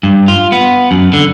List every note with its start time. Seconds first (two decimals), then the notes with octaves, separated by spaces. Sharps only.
0.03 G2
0.28 F4
0.52 B3
0.91 F#2
1.13 D3